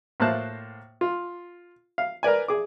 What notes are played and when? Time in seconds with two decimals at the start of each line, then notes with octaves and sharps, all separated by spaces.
0.20 A2 A#3 C5 A5 F#6
1.01 F4
1.98 F5
2.23 A#4 B4 D5 G#5
2.48 G#4 D6